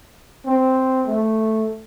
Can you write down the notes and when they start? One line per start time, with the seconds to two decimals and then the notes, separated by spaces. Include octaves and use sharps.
0.46 C4
1.08 A3